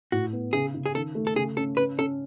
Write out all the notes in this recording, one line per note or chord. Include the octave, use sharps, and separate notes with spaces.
A2 F#4
B3
C#3 G#4
C#3
G#4
D#3 A4
A3
A4
C#3 G#4
C#4 A4
C#4 B4
C#4 A4